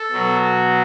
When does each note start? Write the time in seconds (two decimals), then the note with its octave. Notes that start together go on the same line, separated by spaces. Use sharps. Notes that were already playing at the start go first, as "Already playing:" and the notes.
Already playing: A4
0.12 B2 F#3